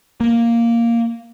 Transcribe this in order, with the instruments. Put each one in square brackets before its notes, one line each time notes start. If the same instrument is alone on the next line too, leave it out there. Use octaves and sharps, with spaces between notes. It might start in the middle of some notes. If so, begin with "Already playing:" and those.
[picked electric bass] A#3